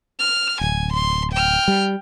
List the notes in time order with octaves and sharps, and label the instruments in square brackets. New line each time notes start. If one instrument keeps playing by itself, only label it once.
[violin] F6
[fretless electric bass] D1 [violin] G#5
[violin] C6
G5 F6
[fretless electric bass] G3